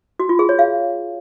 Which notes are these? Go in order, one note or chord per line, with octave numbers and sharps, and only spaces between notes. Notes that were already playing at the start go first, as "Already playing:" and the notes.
F#4
F4
G#4
C#5
F5